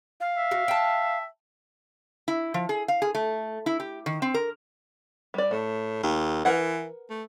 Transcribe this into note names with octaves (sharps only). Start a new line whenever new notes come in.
F5
E5
F#4
G5 A5
E4
F3
G#4
F5
G#4
A3
E4
G4
D#3
C4
A#4
G3 D5
A2 A3
D#2
E3 A#4 B4 F#5
A3